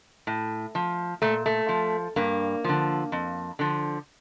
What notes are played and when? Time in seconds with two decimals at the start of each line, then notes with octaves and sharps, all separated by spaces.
0.27 A2
0.75 F3
1.22 A#2 A3
1.46 A3
1.69 F3
2.16 G2 A#3
2.64 D3 F3
3.12 F2
3.59 D3 F3